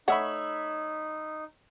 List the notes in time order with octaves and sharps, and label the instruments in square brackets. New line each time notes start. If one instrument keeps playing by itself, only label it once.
[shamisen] A3 F#5 [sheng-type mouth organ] D#4 [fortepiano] C#5 E5 B5